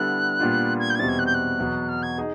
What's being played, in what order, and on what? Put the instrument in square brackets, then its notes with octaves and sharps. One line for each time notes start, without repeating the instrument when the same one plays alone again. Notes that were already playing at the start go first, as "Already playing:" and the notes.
Already playing: [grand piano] D3 G3 B3 E4 A4 [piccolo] F#6
[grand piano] A#2 G3 B3 D4 F4
[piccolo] G#6
G6
G#6
[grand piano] E2 B2 G3 C4 E4 [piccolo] A6
[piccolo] G#6
F#6
G6
F#6
[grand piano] E2 B2 F#3 B3
[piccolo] F6
G#6
[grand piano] D#4 G#4